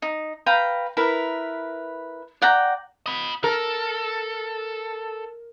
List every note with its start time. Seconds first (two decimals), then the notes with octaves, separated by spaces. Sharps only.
0.02 D#4
0.46 B4 F5 G5 A#5
0.97 E4 A#4 B4
2.42 D5 F#5 G5 A#5
3.06 D#5 B5
3.44 A4 A#4